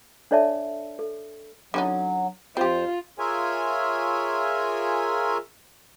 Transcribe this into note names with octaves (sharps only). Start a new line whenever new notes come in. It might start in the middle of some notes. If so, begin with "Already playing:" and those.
D4 A4 C#5 D5 E5 A5
A4
D3 F#3 C#4 D#4
F2 C4 F4 G4 C5
F4 G#4 A#4 C#5 E5 G#5